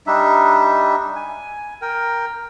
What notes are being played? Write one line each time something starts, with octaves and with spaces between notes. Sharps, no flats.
G3 D4 D#4 E5
G#5
A#4 G5